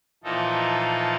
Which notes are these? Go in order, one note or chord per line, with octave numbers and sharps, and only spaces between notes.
A#2 E3 F3 A#3 D#4 A4